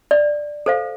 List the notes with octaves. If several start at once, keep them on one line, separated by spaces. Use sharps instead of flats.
D5
A4 C5 F5